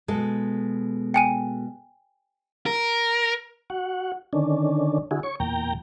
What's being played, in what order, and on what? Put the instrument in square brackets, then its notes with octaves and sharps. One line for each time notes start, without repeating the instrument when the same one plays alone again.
[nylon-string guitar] B2 G#3 A4
[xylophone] G5 G#5 D#7
[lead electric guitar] A#4
[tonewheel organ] F#4 F#5
D3 D#3 C#4 D4
D3 E4 F#4 G#4
C#5 C#6
E2 A#2 G5 A#5